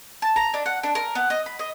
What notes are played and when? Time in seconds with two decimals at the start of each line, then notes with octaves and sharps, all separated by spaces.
0.22 A5
0.36 A#5
0.54 D4
0.66 F#5
0.83 D4
0.95 A#4
1.15 B3
1.30 D#5
1.46 B5
1.59 D#5